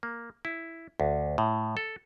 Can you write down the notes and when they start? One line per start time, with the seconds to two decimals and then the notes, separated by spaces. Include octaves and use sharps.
0.03 A#3
0.45 E4
1.00 D2
1.38 A2
1.77 A4